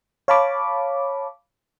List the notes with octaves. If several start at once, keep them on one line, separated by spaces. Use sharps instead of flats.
C#5 F5 A5 B5 D6